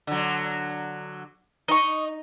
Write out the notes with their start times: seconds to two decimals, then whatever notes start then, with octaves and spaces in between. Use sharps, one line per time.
0.07 D3 F#3
1.68 D#4 D#5 C#6